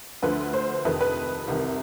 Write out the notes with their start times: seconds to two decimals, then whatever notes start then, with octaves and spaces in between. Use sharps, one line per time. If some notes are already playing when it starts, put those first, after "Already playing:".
0.22 D2 D3 F3 B4
0.53 C5
0.85 F2 C3 D#3 B4
1.01 B4
1.48 C2 C3 D#3